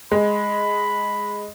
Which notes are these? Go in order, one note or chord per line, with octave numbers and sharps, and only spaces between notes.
G#3 B5